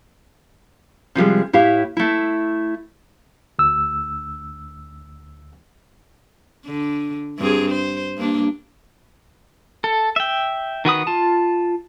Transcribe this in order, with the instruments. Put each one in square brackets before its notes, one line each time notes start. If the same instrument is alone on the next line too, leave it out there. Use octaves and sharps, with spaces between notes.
[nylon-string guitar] C3 F3 G3 G#3
A2 E4 G4 F5
A3 E4
[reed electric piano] D2 E6
[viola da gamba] D3
G2 C4 G#4
C5
G2 A#3 D4
[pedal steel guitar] A4
E5 G5
D#3 F#4 B4 D#6
F4 A5